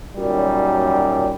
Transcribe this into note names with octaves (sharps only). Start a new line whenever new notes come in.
F#2 A#2 D#3 F#3 G3